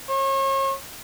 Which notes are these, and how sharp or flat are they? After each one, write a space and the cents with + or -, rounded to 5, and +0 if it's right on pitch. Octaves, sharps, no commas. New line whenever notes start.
C#5 -40